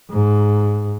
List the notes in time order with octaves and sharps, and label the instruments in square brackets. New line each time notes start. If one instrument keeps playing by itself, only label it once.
[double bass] G#2